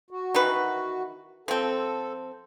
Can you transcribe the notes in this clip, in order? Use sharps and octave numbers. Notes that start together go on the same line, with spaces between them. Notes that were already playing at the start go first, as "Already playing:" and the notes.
F#4
D#3 E3 B4
F3 C4 A4